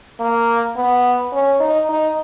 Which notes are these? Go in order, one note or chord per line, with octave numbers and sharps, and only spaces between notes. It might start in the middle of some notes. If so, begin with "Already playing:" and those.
A#3
B3
C#4
D#4
D#4